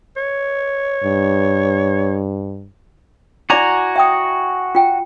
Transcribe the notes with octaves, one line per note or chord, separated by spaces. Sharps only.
C#5
G2
E4 F#4 D5 G#5 A#5 D6
E5 G5 D#6
F4 G5